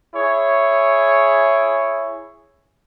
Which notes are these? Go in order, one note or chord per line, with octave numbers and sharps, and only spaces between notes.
E4 G#4 C#5